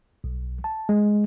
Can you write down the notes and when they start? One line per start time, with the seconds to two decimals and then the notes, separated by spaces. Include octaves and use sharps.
0.24 B1
0.64 A5
0.89 G#3